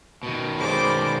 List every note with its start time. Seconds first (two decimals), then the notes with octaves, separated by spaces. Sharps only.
0.23 B2 D#3
0.58 G#3 C5 D5 B5 D6